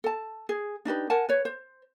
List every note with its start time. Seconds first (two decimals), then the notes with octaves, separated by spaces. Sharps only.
0.04 A4 A5
0.49 G#4
0.85 D4 D#4 G4 B4
1.10 A#4 F#5 G#5 A5
1.29 B4 C#5
1.45 C5